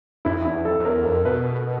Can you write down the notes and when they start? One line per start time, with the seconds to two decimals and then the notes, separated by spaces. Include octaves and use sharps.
0.25 F2 E4
0.45 E2 E4
0.65 F2 A4
0.80 F2
0.85 E2 A#4
1.05 F2 A#4
1.25 B2 B4